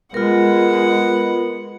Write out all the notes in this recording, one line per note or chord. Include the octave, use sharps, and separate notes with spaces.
G#3 B3 F4 A#4 F#5